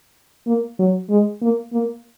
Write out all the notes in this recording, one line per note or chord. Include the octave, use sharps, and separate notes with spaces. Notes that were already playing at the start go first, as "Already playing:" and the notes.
A#3
F#3
G#3
A#3
A#3